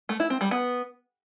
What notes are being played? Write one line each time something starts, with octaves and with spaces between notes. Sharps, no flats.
A3
E4
C4
G3
B3